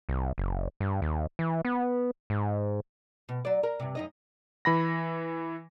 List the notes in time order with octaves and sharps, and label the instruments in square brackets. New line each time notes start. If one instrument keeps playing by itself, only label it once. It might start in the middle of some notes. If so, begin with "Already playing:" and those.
[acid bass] C2
F#1
G2
D#2
E3
B3
G#2
[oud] B2
F#3 D5
A#4
G2 C3
F#2 D#4 D#5
[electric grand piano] E3 B5 A#6